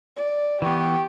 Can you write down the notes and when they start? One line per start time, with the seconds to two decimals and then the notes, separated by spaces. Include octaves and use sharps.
0.16 D5
0.62 E3 B3 G4 G5 C#6